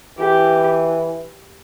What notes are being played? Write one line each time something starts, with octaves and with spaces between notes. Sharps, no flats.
E3 G4